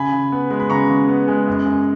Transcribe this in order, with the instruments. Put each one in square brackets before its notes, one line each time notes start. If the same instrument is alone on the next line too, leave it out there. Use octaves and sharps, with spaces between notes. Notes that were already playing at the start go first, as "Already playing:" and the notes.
Already playing: [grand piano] C#3 G#5 B5
C#3
B3
G#3
B5
C#3 A#5 C#6
C#3
B3
G#3
F#2
F#2